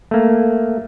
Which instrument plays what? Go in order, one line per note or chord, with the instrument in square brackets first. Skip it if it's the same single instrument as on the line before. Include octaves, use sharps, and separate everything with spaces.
[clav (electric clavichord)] A3 A#3